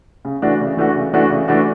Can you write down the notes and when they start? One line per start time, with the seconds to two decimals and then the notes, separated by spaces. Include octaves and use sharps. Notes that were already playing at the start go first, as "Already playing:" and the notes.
0.25 C#3
0.42 E3 A3 D4 F#4
0.60 C#3
0.77 E3 A3 D4 F#4
0.95 C#3
1.13 E3 A3 D4 F#4
1.30 C#3
1.48 E3 A3 D4 F#4